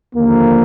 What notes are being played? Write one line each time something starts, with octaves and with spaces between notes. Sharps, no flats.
D#2 D3 F3 A#3